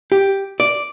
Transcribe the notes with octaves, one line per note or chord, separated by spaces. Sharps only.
G4
D5